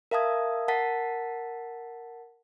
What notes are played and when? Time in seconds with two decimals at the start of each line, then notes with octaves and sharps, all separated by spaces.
0.11 A#4 E5 F5 A5 D#6 G#6
0.68 A#4 F#5 A5 A6 B6